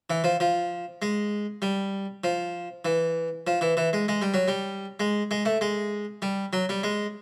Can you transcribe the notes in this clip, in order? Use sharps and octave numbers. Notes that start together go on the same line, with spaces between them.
E3
F3
F3
G#3
G3
F3
E3
F3
E3
E3
G#3
G#3
G3
F#3
G3
G#3
G#3
A3
G#3
G3
F#3
G3
G#3